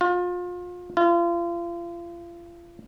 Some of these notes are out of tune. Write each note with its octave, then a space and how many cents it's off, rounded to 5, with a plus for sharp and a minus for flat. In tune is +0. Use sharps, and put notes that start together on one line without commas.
F4 +30
F4 -35